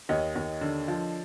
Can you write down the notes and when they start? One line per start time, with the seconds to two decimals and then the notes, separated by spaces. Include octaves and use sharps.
0.09 D#2 C#5 D#5
0.36 D#2
0.61 D3
0.88 F3